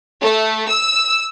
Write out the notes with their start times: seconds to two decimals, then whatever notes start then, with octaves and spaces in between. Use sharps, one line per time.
0.21 A3
0.69 E6